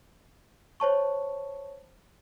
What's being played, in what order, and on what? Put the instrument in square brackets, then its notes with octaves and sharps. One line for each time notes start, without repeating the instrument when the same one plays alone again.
[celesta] C5 C#5 A5 C#6